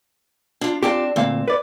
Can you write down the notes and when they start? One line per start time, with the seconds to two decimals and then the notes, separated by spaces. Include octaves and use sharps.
0.61 D4 F4
0.83 C4 D4 F4 G4 A5
1.16 D2 A#2 C4 F5
1.48 B4 D5